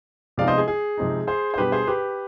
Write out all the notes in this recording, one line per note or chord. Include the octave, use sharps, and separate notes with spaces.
C3 F3 G#3 B3 D#4 D5 F5
C5 D#5
G#4
G#4
C3 F3 G#3 C4 D#4
G#4 C5
C5
B2 G3 D4 G4 B4
G#4 C5
G4 B4